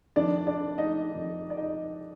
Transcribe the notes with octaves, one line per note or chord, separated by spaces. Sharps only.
F2 D#3 D4 D5
D4 D5
D#4 D#5
F2 D#3
D5
D#4 D#5